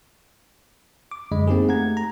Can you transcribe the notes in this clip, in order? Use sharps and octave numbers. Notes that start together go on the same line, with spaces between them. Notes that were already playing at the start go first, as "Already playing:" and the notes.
D6
F#2 D3 G#3 D#5 B5
A#3 C4 D#4 G4 G#4
A3 F#5 A#5 G#6
A#5